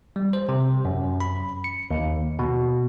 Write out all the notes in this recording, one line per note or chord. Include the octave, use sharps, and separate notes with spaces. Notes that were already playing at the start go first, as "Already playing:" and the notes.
G3
C5
C3
F#2
B5
C#7
D#2
B2